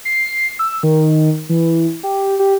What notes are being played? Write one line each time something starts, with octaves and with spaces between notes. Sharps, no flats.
C7
E6
D#3
E3
G4
G4